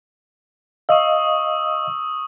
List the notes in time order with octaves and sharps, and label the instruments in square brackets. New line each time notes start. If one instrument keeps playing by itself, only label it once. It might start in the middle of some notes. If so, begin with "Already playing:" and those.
[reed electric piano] D#5 F5 [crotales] C#6 D#6 E6